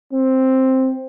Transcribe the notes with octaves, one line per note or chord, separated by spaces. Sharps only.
C4